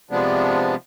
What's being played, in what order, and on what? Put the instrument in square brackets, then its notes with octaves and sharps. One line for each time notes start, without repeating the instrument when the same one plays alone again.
[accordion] C3 F3 G#3 B3 D4